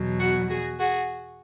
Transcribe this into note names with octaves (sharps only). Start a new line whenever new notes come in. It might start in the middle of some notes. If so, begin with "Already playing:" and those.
Already playing: E2 B2 F#3
F#4
F#4 G#4
F#4 G#4